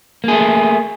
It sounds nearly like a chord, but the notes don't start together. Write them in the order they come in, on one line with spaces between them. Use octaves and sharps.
A#3 G#4 A3